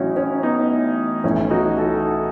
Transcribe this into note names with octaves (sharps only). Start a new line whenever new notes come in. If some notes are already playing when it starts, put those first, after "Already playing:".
Already playing: A1 A2 F#3 C#4 D#4 E4 F#4
C#4
B3 D#4
B1 A2 E3 C#4 E4
D#4 F#4
F#4 A4